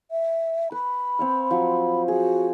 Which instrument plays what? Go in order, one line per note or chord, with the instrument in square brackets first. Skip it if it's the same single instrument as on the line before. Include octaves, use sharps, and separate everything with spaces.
[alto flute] E5
[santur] B4 [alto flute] B5
[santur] C4 C#5 F5
F3 F#3
[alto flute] F#4 [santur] G#4